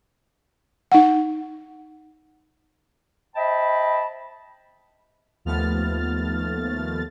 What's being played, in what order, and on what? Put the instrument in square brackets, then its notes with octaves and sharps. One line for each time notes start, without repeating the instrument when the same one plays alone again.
[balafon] D#4 F#5
[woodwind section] C5 D#5 E5 G5 A5 B5
[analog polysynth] D#2 F3 A3 B3 F6 A6